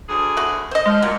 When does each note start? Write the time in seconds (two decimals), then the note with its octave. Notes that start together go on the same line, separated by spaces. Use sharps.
0.08 D2 G#4
0.37 E4 F#4
0.71 C5 D#5
0.86 F3 G#3 F5
1.02 A#2 F#3